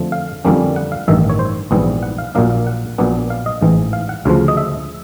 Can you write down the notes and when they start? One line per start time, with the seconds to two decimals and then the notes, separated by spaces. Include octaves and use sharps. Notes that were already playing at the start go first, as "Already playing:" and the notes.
Already playing: F2 D3 F3 A3
0.12 F5
0.45 F2 D3 G3 A#3 C#4
0.76 F#5
0.92 F5
1.08 A1 G2 D#3 E5
1.30 C#5
1.39 C5
1.71 A#1 G#2 E3 G3 B3
2.03 F#5
2.18 F5
2.35 A#1 A#2 F#3 A#3 D4 F5
2.50 F5
2.67 F#5
2.98 A#1 A#2 F#3 B3 D4
3.30 F5
3.46 D#5
3.62 A1 G#2 E3
3.93 F5
4.09 F#5
4.25 D2 C#3 F3 F5
4.48 D#5
4.57 E5